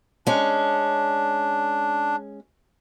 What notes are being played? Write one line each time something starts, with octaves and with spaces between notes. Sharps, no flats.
G#3 C#4 D4